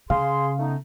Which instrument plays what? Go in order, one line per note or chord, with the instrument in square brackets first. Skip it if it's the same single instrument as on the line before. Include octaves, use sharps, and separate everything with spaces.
[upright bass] C#3 [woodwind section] G#4 C6 [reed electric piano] F5
[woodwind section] A3 B3 D#4